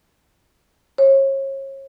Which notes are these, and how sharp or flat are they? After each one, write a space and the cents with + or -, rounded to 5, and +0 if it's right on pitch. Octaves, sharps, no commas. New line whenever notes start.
C#5 -35